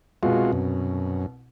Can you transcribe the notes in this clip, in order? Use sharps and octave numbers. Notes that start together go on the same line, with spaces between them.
C2 B2 G#3 F4 F#4
F#2